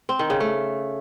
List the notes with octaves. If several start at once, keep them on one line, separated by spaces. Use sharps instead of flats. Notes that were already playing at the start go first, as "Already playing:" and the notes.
C4
D#3
C#3
A3